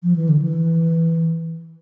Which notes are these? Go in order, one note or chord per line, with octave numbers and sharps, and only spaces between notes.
F3
E3
D3
E3